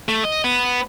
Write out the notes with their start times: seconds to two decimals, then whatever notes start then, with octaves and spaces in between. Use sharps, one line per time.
0.09 A3
0.24 D#5
0.44 B3